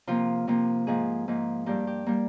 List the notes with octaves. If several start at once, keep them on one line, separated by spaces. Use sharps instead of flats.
C3 F3 A#3 F4
C3 F3 A#3
G#2 F3 A#3 G#4
G#2 F3 A#3
G2 G3 A#3 G4
G4
G3 A#3